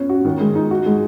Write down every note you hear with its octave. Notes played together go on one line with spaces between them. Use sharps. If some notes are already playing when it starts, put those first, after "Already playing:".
Already playing: B3 C#4
F#4
D#3
G#3
D#4
F#4
G#3